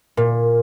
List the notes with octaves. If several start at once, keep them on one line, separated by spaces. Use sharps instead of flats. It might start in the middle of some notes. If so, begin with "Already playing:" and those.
A#2